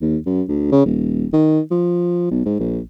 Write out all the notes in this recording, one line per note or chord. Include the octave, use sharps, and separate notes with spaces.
D#2
F#2
D2
C#3
D#1
D#3
F3
B1
G#2
A#1